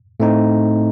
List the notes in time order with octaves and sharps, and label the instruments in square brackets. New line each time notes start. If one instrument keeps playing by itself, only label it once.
[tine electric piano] A2 A3 C4 D#4